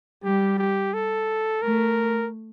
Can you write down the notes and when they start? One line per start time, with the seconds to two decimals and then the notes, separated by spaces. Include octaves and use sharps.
0.24 G3 G4
0.58 G4
0.93 A4
1.62 A3 A#4